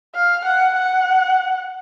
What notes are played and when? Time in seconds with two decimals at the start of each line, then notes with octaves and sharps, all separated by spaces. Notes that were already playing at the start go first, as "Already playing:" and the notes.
0.15 F5
0.45 F#5
0.76 F#5